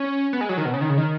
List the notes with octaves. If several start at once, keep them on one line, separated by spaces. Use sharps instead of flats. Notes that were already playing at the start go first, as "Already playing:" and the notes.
Already playing: C#4
B3
G#3
F#3
D#3
B2
C#3
D#3
C#3
D#3